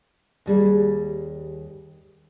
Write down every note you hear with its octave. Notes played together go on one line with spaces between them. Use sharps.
D#2 G3 G#4